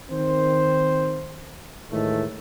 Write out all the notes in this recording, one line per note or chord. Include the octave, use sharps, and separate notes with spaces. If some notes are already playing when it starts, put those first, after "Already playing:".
D#3 C4 C5
A2 D#3 E3 G#3 A3